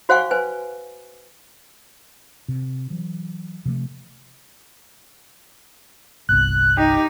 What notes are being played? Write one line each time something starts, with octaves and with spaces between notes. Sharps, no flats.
F#4 C5 F5 F#5 G#5 C#6
B4 C5 G#5
C3
E3 F#3
C3 F3 F#3 A3
G1 C2 F#6
D#4 G4